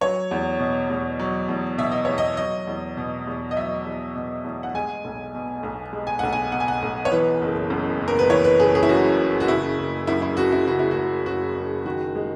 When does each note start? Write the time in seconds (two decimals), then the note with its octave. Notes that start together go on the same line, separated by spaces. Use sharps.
0.01 F#3 C#5
0.31 E2
0.60 B2
0.90 E2
1.19 F#3
1.49 E2
1.78 B2 E5
1.92 D#5
2.05 E2 C#5
2.18 D#5
2.37 F#3 D#5
2.67 E2
2.97 B2
3.27 E2
3.51 D#5
3.57 F#3 E5
3.85 E2
4.16 B2
4.44 E2
4.63 F#5
4.74 G#3 G#5
5.04 B1
5.35 B2
5.63 B1
5.93 G#3
6.07 G#5
6.19 B1 F#5
6.33 G#5
6.52 B2 F#5
6.60 G#5
6.68 F#5
6.82 B1
7.05 C#5
7.12 E3 B4
7.42 F#1
7.70 F#2
8.01 F#1
8.08 A#4
8.19 B4
8.29 E3 C#5
8.44 B4
8.60 F#1 G#4
8.75 G#4
8.83 E4
8.89 F#2 F#4
9.19 F#1
9.40 F#4
9.48 C#3 E4
9.78 F#1
10.07 F#2 E4
10.22 E4
10.37 F#1 F#4
10.52 E4
10.67 C#3 F#4
10.79 E4
10.91 F#4
10.97 F#1
11.26 F#2 F#4
11.56 F#1
11.85 D#3 F#4
12.15 G#3